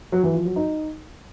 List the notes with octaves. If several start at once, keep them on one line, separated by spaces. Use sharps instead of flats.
F#3
E3
F3
F#3
D#4